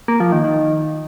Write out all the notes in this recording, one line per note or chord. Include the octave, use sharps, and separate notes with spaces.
A#3
F3
D#3
D#3